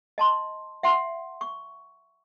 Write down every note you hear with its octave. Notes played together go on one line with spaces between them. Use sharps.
D#5 A5 C6
E5 F#5 C6
C#6